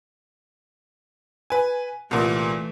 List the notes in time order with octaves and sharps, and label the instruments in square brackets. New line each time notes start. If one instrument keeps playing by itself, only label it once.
[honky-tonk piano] B4 G#5
[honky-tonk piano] C2 A#2 [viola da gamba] E3 A3